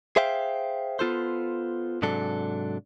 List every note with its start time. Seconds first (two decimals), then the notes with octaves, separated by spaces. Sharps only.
0.16 G#4 C5 E5 F5 G5
0.99 B3 F4 A4 C5
2.02 G#2 C3 F#3 D4 A4